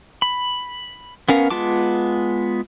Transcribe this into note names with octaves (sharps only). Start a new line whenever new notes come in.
B5
B3 C#4 A#4 F5
G#3 B3 F4 A5 D6